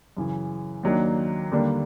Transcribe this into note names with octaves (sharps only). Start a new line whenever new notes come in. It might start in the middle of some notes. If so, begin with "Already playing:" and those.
F#2 C#3 E3
D#2 D#3 F#3 A#3 D4
D#2 D3 G3 A#3 D4